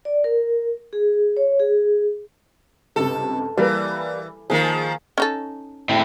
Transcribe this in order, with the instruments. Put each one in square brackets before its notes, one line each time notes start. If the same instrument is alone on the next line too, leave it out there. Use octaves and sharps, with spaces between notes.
[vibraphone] D5
A#4
G#4
C#5
G#4
[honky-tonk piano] C#2 G2 C3 [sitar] A4
[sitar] E3 [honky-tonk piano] G3 A#3 B4
[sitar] D#3 F3 [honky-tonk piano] A#3 G#4
[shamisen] C#4 D#4 A4
[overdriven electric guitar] A2 C4